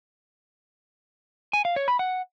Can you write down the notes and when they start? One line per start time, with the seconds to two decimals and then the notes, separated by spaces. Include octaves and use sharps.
1.53 G#5
1.65 F5
1.76 C#5
1.88 B5
1.99 F#5